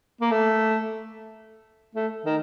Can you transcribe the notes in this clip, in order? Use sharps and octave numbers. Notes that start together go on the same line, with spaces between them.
A#3
A3
A3
D#3